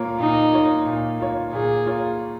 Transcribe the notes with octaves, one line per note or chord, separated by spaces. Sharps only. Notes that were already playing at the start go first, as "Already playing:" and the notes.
Already playing: A#2 A#3 F4 C#5
A#2 D#4
A#3 F4 C#5
A#2
A#3 F4 C#5
A#2 G#4
A#3 F4 C#5